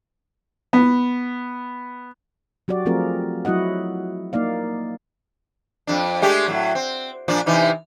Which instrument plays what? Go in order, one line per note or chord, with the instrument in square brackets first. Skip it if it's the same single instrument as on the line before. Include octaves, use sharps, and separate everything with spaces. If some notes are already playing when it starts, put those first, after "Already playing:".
[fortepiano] B3
[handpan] F#3 F#4 G4 D5
F3 A3 C4 F4 G#4 A#4
F#3 E4 F#4 D#5 F#5
A#3 D#4 D5 F5
[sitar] F2 D4
G#3 A3 G4
A2 F#3
C4
A#2 F3 D4
C3 E3 D#4